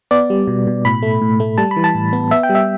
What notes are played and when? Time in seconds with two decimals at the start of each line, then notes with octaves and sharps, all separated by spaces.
0.11 B3 D5
0.30 G3
0.47 B2
0.67 B2
0.85 A2 B5
1.03 A3
1.22 A2
1.40 A3
1.58 G3 A5
1.71 B5
1.76 E3
1.84 A5
1.95 A2
2.13 B3
2.31 B3 E5
2.43 G5
2.50 G3
2.55 E5